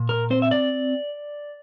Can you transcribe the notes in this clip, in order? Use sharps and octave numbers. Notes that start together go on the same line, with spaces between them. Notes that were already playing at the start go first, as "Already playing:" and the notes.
Already playing: A#2
A#4
C4 C5
E5
D5